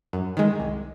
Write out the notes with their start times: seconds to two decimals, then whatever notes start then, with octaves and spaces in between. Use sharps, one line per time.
0.13 F#2
0.37 D#3 G#3
0.60 C2